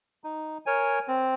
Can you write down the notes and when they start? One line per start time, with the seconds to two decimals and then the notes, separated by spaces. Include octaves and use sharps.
0.24 D#4
0.66 A#4 C#5 G#5
1.08 C4